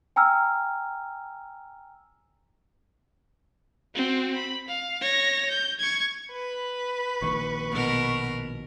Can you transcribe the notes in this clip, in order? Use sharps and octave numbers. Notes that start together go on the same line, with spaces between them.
G5 G#5 A#5 E6 F6
C4 F#4
B5
F5
C#5 A#6
G6
C#6 G#6
B4
A#1 D#3 A#3 C#6
B2 A#4